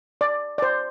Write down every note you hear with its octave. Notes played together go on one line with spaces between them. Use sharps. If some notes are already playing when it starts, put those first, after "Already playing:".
D5
D5
C5